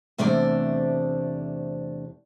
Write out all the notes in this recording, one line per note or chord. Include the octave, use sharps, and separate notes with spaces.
E2 C3 A3 D4 C5 D5